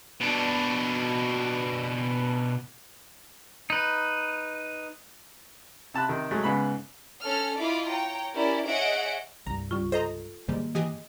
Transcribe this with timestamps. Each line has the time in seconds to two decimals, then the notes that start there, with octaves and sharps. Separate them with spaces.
0.20 B2 D4
3.70 D#4 B4
5.94 C3 A5 B5 F#6
6.09 C3 D#3
6.31 F#3 G#3 A3
6.43 G#2 C#3 B3 B5
7.24 C#4 A4 F6
7.59 E4 F4 D#5 B5 D6 C7
7.89 C#5 G5 A#5
8.35 C#4 E4 G4 A#4 D5
8.67 G#4 C#5 D#5 E5 F#5 D7
9.47 C2 G2 A#5
9.71 C#2 G3 F4 C#6
9.92 A4 C5 D#5 A#5
10.48 G#2 C3 D#3 G3 G#3 A#3
10.75 E3 G4 G#4 D#5